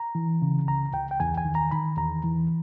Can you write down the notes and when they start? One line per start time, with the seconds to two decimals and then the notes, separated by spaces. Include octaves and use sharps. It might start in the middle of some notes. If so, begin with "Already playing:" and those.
Already playing: A#5
0.15 E3
0.42 C#3
0.67 C#2 A#5
0.94 C#2 G5
1.11 G5
1.20 E2 G#5
1.37 G#5
1.45 D#3
1.55 A#5
1.71 D#3 B5
1.97 E2 A#5
2.24 E3